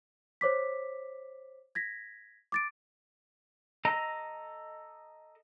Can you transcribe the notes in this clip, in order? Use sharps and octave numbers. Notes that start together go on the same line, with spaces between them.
C5 C#5 D6 B6
G#6 A#6 B6
D6 A6 D7
A4 D#5 A#5